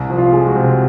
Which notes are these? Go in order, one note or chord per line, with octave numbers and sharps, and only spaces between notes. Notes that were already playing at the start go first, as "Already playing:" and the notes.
Already playing: C2
F3
F4
G#3
F#4
C3